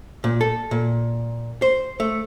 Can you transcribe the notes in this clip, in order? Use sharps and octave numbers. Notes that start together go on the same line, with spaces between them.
A#2
A4
A#2
C5
A3